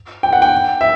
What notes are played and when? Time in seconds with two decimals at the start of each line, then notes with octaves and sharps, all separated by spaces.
0.23 G5
0.33 F#5
0.42 G5
0.81 E5